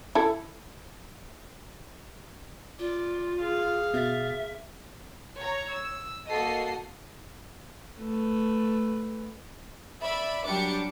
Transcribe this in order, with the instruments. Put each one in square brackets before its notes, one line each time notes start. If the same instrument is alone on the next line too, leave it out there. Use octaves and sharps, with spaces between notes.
[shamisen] E4 A4
[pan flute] F4 [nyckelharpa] D5
[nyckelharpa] G#4 F5
[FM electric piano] B2 A6 [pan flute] E5
[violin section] C#5 A#5
E6
A#3 F#4 A4 D#5 C7
[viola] A3 B4
[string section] D5 E5 B5
F#3 G3 D4 G4 D6 C#7